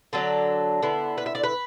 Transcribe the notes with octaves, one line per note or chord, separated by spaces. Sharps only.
D3 F#3 D4 A4
D3 B3 E4
B4
E5
D5
B4